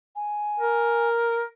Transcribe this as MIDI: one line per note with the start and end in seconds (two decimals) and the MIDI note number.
0.15 1.08 80
0.60 1.44 70